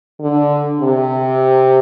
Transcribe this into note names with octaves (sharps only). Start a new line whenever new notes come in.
D3
C3